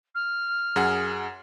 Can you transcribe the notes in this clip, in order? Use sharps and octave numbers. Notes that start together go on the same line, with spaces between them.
F6
F#2 G#4 F#5